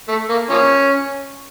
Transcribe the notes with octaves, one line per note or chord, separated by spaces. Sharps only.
A3
A#3
F3 A#3 C#4